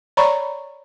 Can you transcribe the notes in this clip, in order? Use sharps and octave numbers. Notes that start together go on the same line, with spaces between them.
C#5 D5 A#5 B5 C#6